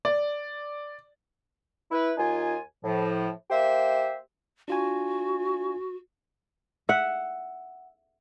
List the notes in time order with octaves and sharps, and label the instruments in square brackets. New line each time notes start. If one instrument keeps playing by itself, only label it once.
[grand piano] D5
[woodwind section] E4 B4
D#2 D#4 F4 G#5
A2 F3
A#3 G4 C5 E5
[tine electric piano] D4 F4 G#5 [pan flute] F#4
[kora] E5 F#5